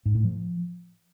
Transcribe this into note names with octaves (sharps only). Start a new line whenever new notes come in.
G#2
A2
F3